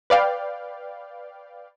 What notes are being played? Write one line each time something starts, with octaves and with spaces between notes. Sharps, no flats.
B4 D5 F5 G5